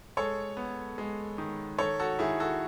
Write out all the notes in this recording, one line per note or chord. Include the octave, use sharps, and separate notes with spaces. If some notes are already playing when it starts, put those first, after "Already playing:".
G#3 A4 C#5
B3
G#3
D#3
D#3 A4 C#5
F#4 A4
D#3 E4 G#4
F#4 A4